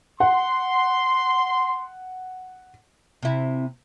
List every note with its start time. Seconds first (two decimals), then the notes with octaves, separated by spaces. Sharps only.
0.20 F#5 C6
3.23 C3 E4